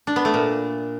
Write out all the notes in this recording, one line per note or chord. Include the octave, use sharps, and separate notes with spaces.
D4
B3
A3
A#2